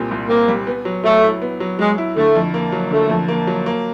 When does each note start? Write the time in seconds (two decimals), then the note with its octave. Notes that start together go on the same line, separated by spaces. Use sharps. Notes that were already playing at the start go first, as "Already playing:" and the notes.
Already playing: C2 A#2 G3 C4
0.11 C2
0.29 A#3 C4
0.48 G3
0.67 B3
0.85 F#3
1.04 F#3 A3
1.23 E4
1.42 B3
1.60 F#3
1.79 F#3 G#3
1.98 E4
2.16 D3 A3
2.35 F2
2.54 A#3
2.72 F#3
2.91 D3 A3
3.10 F2
3.28 A#3
3.47 F#3
3.66 A#3